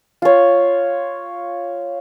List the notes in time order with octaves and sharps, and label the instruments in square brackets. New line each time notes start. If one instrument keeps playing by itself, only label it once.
[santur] F4 C#5